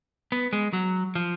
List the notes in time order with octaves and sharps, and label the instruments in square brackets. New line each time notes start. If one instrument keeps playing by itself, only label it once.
[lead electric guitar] B3
G#3
F#3
F3